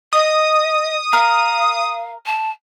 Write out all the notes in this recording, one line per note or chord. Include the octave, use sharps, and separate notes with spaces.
D#5 D#6
A#4 F5
A5